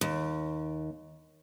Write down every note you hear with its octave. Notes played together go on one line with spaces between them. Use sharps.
D#2